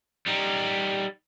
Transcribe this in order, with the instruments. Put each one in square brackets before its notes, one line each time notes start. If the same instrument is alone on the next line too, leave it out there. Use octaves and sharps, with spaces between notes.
[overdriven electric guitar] G3 D#4